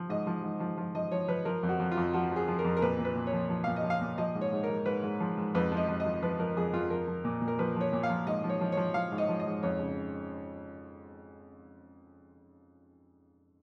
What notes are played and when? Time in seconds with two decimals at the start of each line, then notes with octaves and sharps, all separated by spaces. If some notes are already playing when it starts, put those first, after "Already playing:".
Already playing: F3
0.09 G#2 D#5
0.27 F3
0.43 G#2
0.60 F3
0.77 F3
0.95 F3 D#5
1.12 F3 C#5
1.28 F3 B4
1.45 F3 A#4
1.63 F2
1.69 F#4
1.80 F2
1.92 F4
1.97 F2
2.13 F3 F#4
2.31 F3 G#4
2.48 F3
2.59 A#4
2.64 F2
2.77 A#4
2.82 A#2 B4
2.99 A#2
3.05 B4
3.16 A#2
3.27 C#5
3.33 F3
3.50 F3
3.64 A#2 F5
3.76 D#5
3.84 F3
3.90 F5
4.01 A#2
4.18 F3 D#5
4.35 G#2
4.41 C#5
4.52 G#2
4.63 A#4
4.69 G#2
4.86 G#2 B4
5.03 G#2
5.20 F3
5.37 G#2
5.55 F2 B4
5.72 F3
5.77 D#5
5.88 F2
6.00 D#5
6.05 F3
6.22 F3 B4
6.39 F3 A#4
6.56 F2 G#4
6.73 F2 F4
6.90 F3 A#4
7.07 F3
7.25 A#2
7.42 A#2
7.48 A#4
7.59 F3 B4
7.76 F3 C#5
7.93 A#2
8.03 F5
8.10 F3
8.26 G#2 D#5
8.44 F3
8.49 C#5
8.61 F3
8.72 F3 C#5
8.94 F3 F5
9.12 G#2
9.18 D#5
9.28 F3
9.40 D#5
9.46 G#2
9.63 F2 C#5
9.79 C#3